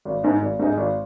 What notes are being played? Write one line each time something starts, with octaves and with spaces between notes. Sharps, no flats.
G#1
G#2 G#3 D#4
G#1
G#2 G#3 D#4
G#1